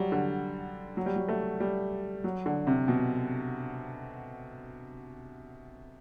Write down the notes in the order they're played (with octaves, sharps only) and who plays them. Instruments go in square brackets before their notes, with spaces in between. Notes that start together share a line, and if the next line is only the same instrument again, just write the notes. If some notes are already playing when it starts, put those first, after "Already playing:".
Already playing: [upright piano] F#3 G3
D3
F#3
G3
F#3
A3
G3
F#3
D3
C3
B2